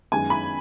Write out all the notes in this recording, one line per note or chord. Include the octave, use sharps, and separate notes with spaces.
F#2 D#3 G#3 B3 G#5
B5